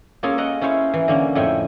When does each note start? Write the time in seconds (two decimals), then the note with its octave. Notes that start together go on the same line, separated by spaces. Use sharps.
0.23 A#3 C#4 F4 G#4 A4
0.38 A#4 D#5 F#5
0.61 C#4 E4 C5 C#5 F5
0.94 E3
1.08 D3 A#3 C#4
1.35 F2 A2 E5 G5 G#5